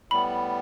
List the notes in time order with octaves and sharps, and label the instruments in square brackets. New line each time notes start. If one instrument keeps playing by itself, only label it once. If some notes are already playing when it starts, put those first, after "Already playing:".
[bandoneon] A2 G3 B3 [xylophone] B5